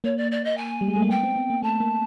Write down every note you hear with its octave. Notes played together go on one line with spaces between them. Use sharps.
A#3 C#5
D5
D5
D#5
G#5
G3
G#3
A3
A#3
B3 G5
C4
B3
A#3
A3 A5
A#3